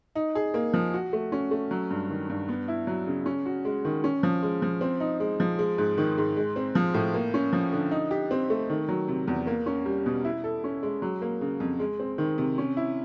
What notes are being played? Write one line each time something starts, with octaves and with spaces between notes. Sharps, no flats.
D#4
G#4
A#3
F3
F#4
A3
C#4
A3
F#3
G2
D#3
G2
B3
E4
F#3
C#3
C#4
F#4
G#3
D#3
C#4
F3
G#3
F3
C4
D#4
G#3
F3
G#3
G#2
D#3
G#2
G#3
C4
F3
A2
A#3
C#4
F3
D3
D#4
G4
C4
A3
D#3
F#3
C3
E2
A#3
C#4
G3
B2
E4
A4
C#4
G#3
F#3
A#3
C#3
F2
G#3
C4
D#3
C3
C#4
E4